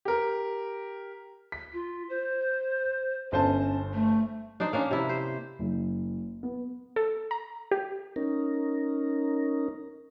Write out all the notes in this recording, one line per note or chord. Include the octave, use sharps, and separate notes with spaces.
G4 A#4
B6
F4
C5
G1 C#4 C5 A5
A3
D4 D#4 C5 D5
A#3 C#4 D4
C3 E4
C5
F#1
B3
A4
A#5
G4
C#4 D#4 A#4